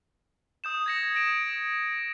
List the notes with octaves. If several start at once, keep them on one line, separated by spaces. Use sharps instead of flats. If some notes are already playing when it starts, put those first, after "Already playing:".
D#6 G6 E7
G#6 A#6 C#7
A#6 D7 E7